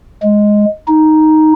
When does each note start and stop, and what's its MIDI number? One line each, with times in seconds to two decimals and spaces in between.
0.22 0.65 56
0.87 1.53 63